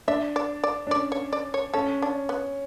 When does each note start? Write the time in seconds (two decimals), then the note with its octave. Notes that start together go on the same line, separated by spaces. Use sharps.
0.08 D4 E5
0.36 D5
0.64 D5
0.87 D4
0.91 C#4 D5
1.12 C#5
1.33 D5
1.54 C#5
1.74 C#4 A4
2.02 D4
2.29 B3